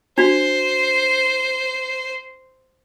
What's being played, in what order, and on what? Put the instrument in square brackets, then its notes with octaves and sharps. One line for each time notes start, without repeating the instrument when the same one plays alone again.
[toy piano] D4 F#4 [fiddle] C5